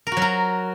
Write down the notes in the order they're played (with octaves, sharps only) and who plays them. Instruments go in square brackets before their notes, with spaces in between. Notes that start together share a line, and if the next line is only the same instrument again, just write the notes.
[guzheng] A#4
F#4
F#3
A#4